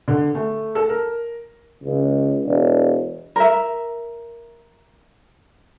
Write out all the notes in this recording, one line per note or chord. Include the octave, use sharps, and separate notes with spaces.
D3
A3
A4
A#4
C#2
E1
A#4 E5